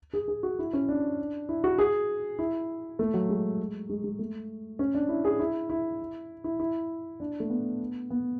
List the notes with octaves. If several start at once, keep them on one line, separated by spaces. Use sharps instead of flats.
G#4
G#4
F#4
E4
C#4
D4
E4
F#4
G#4
E4
A3
F#3
G#3
G#3
G#3
A3
C#4
D4
E4
G#4
E4
E4
E4
E4
D4
A3
B3
B3